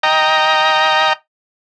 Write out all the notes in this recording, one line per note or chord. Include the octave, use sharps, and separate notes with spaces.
D#5 G5 A#5